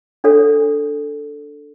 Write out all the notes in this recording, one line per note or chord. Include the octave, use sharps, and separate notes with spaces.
D4 A4 C#5